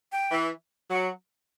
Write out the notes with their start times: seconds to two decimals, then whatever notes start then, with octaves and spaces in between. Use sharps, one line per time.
0.12 G5
0.31 E3
0.90 F#3 F#5